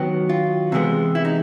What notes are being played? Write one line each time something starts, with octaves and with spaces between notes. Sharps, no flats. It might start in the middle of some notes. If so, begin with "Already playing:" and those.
Already playing: D#3 F#3 B3 G4
F4
C3 E3 G#3 B3
E4
D#4